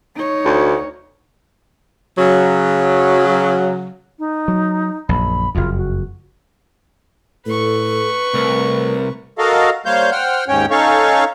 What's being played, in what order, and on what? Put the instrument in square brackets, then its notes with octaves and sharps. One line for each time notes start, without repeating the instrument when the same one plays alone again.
[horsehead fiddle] D#4 C#5
[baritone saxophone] D2
[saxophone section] C#3 F#3
[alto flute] D#4
[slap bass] F#3
[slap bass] A#1 F#2 [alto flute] B5
[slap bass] F#1 F2 [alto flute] F4
[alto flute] F#4
[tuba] A2 [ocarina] A4 [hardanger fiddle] B4 C#6
[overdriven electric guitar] C2 [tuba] A3 [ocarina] A#4
[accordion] F#4 A4 A#4 D#5 F5
G3 A#3 C5 C#5 F5 G6
C5 F#5 G5 F6
D#2 G#2 C#4 C#5 G5
C#4 D#4 A4 C#5 F5 C#6